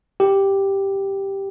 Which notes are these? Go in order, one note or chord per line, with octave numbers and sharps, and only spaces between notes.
G4